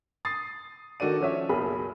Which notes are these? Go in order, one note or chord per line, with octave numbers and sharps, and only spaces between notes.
D#6 A6 C7
D#3 F#4 A4 D5 D#7
F3 C#4 C#5 E5
F#1 B1 G#4 G#5 B5